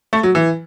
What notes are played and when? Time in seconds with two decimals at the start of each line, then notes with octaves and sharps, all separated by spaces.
0.13 A3
0.23 F#3
0.35 E3